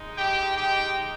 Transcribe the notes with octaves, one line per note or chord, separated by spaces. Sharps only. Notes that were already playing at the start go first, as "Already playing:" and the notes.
Already playing: G#3 D#4
G4 G5
G4 G5